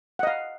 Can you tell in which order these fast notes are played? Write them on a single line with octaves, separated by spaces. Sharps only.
F#5 D#5 F5